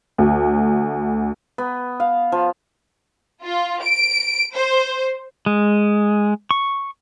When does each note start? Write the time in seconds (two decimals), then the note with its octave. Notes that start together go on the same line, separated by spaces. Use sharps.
0.18 D2
1.58 B3
2.00 F5
2.32 F3
3.44 F4
3.82 D7
4.55 C5
5.46 G#3
6.51 C#6